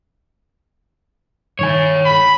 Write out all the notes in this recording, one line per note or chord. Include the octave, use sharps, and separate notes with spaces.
G2 D#3 A4 C#5 G#5
B5